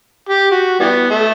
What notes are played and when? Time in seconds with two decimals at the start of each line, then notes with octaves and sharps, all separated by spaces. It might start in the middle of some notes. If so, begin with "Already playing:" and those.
0.29 G4
0.51 F#4
0.80 E3 G3 B3
1.10 A3